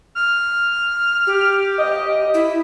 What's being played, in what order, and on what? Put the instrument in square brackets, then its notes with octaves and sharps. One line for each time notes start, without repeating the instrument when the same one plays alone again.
[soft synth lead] F6
[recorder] G4
[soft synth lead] D#5
[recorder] E4